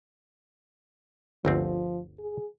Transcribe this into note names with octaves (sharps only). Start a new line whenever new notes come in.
G1 D2 F3 C4
G#4